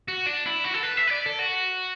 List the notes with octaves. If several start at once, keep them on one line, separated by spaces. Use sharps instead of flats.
F#4
D4
E4
F#4
A4
B4
E5
B4
D5
A4
F#4